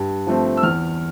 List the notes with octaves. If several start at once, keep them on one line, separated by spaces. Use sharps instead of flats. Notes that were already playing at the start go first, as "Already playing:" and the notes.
Already playing: G2
F3 A3 C4
E6
E2 F6